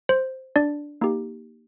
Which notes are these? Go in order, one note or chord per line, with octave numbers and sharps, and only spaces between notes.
C5
D4 D5
A#3 D#4 G4